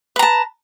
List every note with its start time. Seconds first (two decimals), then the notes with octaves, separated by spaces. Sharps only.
0.16 B4
0.19 A#5
0.23 A5